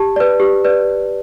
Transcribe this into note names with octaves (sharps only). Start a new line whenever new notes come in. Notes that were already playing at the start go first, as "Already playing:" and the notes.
Already playing: G4 A5
B4 D5
G4
B4 D5